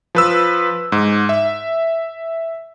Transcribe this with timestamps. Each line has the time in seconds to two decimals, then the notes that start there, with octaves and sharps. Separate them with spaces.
0.15 F3 B4 E6
0.92 G#2
1.29 E5